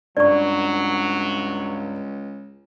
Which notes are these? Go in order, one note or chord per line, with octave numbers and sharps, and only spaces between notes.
C#2 G2 F#3 D5 C#6